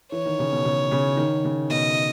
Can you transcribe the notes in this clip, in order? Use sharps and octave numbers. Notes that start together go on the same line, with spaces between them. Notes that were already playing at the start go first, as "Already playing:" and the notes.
E3 C#5
D#3
C#3
B2
C#3
C#3
D#3
C#3
B2 D#5